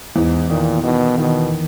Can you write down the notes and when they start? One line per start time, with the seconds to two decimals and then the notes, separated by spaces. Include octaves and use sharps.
0.15 E2 G#2
0.50 A#2 D#3
0.84 B2 D#3
1.18 B2 D#3